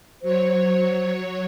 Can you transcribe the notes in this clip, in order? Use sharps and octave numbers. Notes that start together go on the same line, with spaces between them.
F#3 C5 C#5